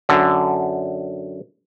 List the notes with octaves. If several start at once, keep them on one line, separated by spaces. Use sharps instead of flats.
F#2 D3